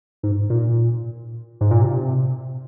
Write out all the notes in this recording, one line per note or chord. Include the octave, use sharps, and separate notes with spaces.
G#2
A#2
G#2
A#2
C3